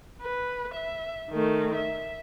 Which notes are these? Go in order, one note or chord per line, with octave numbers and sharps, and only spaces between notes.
B4
E5
D#3 A3
E5